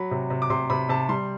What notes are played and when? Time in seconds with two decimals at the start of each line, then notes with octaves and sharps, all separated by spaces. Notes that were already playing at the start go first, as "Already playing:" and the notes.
Already playing: F#3 B5
0.11 C3
0.30 C3
0.42 D6
0.50 C3 C6
0.70 C3 B5
0.89 C3 A5
1.09 G3 C6